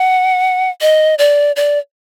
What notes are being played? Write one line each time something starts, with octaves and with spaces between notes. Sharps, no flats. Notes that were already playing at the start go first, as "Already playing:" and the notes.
Already playing: F#5
D#5
D5
D5